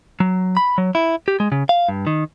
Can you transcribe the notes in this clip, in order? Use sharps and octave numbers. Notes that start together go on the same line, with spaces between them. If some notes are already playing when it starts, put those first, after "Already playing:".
F#3
B5
F#3
E4
G4
G#3
C#3
F5
G2
D#3